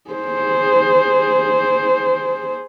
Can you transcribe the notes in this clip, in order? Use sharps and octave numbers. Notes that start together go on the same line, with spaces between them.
G#4 C5